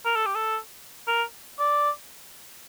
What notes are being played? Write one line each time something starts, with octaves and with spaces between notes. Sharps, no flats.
A#4
A4
G4
A4
A#4
D5